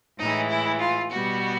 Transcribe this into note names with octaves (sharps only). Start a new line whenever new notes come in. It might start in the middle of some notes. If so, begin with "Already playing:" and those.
A2 E3 G#3 D#4
E4
F4
B2 G3 B3 F#4